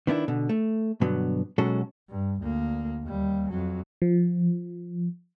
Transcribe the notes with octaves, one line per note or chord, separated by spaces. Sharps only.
D#3 B3 D4 E4
B2 D3
A3
G2 B2 D3 F#3 B3
B2 F#3 G#3 C#4 F#4 A4
G2
D2 A#3
D#2 G3
F2 F#3
F3